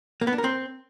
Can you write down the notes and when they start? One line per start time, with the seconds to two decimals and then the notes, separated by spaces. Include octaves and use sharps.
0.21 A#3
0.27 B3
0.33 D4
0.38 A#4
0.44 C4